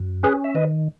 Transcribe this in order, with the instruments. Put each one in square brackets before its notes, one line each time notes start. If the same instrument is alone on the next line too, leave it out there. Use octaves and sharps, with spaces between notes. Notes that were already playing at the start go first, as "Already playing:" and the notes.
Already playing: [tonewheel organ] F#2
C#4 G#4 B4
E5
D#3 B4 D#5